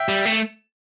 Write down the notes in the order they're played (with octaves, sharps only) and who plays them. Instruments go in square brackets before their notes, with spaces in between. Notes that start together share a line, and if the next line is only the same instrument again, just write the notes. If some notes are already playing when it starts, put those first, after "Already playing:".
Already playing: [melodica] E5 G5
[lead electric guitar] G3
A3